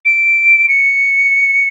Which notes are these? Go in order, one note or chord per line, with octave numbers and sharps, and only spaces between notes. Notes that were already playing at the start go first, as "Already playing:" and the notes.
D7
C#7